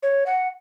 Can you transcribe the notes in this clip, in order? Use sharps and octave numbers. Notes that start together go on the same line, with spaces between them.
C#5
F#5